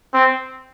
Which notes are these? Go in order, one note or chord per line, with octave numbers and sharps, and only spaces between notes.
C4